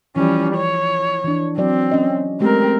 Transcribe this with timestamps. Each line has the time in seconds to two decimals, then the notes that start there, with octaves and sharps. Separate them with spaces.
0.16 E3 F3 G3 C#4
0.56 C#5
1.24 E3 D4
1.58 F#3 C4 D5
1.91 C#4 D#5
2.40 G#3 A3 C4 G4 A#4